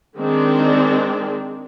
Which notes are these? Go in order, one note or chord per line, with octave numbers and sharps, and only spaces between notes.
D#3 G#3 C4 D4